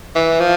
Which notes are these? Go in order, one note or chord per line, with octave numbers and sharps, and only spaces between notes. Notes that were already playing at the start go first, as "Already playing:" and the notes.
E3
F3